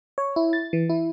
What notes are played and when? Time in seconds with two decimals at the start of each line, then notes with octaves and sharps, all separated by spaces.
0.18 C#5
0.36 E4
0.53 A6
0.73 E3
0.90 E4